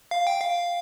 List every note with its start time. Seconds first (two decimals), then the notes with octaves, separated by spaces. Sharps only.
0.11 F5
0.27 G5
0.41 F5